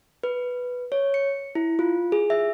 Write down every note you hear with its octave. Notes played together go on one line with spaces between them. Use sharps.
B4
C#5
C#7
E4
F4
G#4
E5